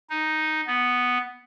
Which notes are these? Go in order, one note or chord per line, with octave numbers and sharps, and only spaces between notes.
D#4
B3